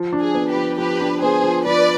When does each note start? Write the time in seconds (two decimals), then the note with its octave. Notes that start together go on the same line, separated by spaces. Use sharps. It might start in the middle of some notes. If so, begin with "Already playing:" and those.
Already playing: F3
0.13 D4
0.21 G#4
0.35 B3
0.49 G4 B4
0.56 F3
0.78 F3 G4 B4
1.01 D4
1.22 B3 G#4 C5
1.44 F3
1.65 F3 B4 D5